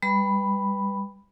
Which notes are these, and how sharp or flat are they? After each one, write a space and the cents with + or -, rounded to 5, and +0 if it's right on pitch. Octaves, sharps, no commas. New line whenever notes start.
G3 +20 B4 +0 B5 +0